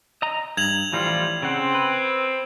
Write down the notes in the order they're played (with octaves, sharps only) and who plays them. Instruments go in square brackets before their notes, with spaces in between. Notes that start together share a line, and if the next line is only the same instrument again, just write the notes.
[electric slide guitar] D#5 A#5
[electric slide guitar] G2 [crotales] G#6 F7 F#7
[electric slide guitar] A2 E3 F3 [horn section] G3 F4
[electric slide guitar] C#3 F#5 [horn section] C4
[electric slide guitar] B4